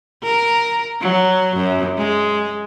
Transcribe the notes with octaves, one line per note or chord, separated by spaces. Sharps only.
A#4
F#3
F#2
G#3